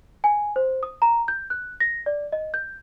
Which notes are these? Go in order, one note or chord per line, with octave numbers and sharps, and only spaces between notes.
G#5
C5
D#6
A#5
G6
F#6
A#6
D5
D#5
G6